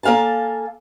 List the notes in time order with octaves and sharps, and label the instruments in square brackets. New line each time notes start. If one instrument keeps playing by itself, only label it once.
[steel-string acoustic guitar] A#3 A4 F5 G#5 A5